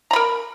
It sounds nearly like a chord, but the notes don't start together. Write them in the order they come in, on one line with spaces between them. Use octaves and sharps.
A#5 B5 A#4